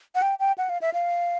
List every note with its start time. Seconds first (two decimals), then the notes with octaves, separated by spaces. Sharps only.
0.15 F#5
0.22 G5
0.39 G5
0.58 F#5
0.69 F5
0.81 E5
0.93 F5